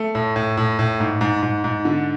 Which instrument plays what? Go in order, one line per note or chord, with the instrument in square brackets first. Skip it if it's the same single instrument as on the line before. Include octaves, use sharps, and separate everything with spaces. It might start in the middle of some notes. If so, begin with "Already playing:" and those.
Already playing: [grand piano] A3
A2
A2
A2
A2
G#2
G#2
G#2
G#2
D3